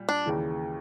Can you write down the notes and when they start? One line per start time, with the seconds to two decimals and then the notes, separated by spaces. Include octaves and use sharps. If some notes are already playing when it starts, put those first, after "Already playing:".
Already playing: A#2 G3
0.09 D4
0.25 D#2 C#3 E3